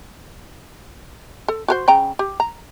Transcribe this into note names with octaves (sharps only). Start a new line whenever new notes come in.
A4
F#4 A#4 C5
C#3 G5 A#5
G4
A#5